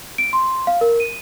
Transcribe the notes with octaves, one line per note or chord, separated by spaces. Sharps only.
D7
C6
F5
A#4
D#7